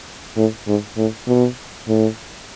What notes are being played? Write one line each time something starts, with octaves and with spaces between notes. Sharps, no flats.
A2
G#2
A2
B2
A2